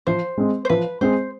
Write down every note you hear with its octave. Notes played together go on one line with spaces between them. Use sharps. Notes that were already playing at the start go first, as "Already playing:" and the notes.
F3 C5
G#3 C4 G#4
C5
F3 B4
G#3 C4 G#4 C5